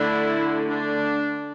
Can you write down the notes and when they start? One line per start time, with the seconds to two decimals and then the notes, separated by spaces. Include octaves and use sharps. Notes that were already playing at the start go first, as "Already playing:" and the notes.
Already playing: D3 A3 D4 E4
0.67 D4